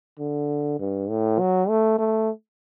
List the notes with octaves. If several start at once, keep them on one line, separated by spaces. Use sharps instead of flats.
D3
G2
A2
F#3
A3
A3